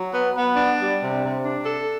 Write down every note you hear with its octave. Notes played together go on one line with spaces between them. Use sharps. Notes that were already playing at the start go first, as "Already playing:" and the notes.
Already playing: F#3
B3
B3
D4
G3
C3
C3
D4
A4